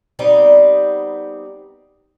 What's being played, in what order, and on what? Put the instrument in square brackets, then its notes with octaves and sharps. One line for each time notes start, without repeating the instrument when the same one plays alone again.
[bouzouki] G3 B3 C4 D#4